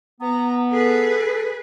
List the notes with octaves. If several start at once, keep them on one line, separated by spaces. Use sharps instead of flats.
B3 A#5
G#4 A4 B4